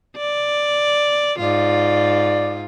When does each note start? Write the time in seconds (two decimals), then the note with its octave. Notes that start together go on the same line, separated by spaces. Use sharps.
0.17 D5
1.39 G#2 F4 D5